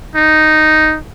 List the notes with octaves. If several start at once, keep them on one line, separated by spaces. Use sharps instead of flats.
D#4